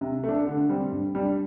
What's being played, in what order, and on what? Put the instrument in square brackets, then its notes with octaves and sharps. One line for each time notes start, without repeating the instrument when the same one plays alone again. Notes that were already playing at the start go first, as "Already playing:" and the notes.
[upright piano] C3
A3 D4
D3
G3 C4
G2
G3 D4